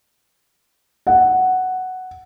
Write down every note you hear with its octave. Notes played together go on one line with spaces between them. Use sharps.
F#5